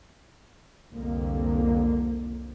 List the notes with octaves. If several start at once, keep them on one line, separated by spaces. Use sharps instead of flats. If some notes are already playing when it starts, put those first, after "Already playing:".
C2 F2 D3 A#3